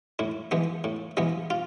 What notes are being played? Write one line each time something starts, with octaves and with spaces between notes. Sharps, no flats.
A2 E4
E3 G#3 B3
A2
E3 G#3 B3
F4